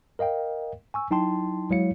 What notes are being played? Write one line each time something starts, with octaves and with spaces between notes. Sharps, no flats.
A#4 D#5 F5 G5
G#5 C#6 E6
F#3 D#4 E4 G5 A5 C6
F#3 G#3 E4 C#5 F5 C#7